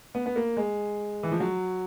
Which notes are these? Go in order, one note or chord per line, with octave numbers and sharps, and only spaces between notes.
B3
B3
A#3
G#3
E3
F3
F#3